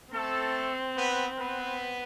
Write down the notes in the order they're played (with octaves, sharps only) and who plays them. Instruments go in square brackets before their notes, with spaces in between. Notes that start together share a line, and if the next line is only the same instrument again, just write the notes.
[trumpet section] A3 A4 [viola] C4
[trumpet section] B3 B4
B3 B4